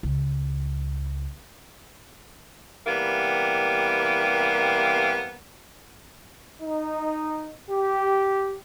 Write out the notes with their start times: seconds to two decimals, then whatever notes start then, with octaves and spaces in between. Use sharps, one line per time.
0.03 C#2
2.86 C3 E3 G3 A#3 B3
6.62 D#4
7.70 G4